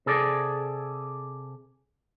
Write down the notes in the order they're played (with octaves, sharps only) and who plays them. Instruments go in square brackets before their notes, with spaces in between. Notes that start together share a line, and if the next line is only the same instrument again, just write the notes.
[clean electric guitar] C3 G#4 A4 D5